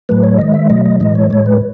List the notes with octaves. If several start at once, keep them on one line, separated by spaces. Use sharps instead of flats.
A2 F#3 A3 B4
C#5
D#3 G#3 D#5
E5
B2 F#3 A3 D#5
D#5
A2 E3 G#3 D#5
C#5
A2 G#3 C#5
B4